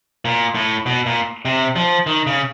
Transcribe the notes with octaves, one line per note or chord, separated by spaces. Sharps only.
A#2
A2
B2
A#2
C3
F3
D#3
C#3